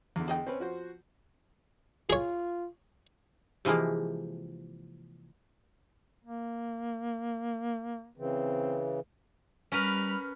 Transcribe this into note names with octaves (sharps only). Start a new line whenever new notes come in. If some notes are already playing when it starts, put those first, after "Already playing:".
E2 D3
G#4 D#5 G5
C4 C#4 B4
F3 F#4 C5
F4 G#4 C#5
C3 E3 F3 G#3 A#3
A#3
C#3 E3 C4
G3 C#4 A#4 B4 B5 F6